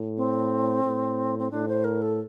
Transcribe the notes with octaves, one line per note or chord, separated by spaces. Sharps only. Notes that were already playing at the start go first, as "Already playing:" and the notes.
Already playing: A2
C4
A2
C4
A2 D4
C5
A#4
A4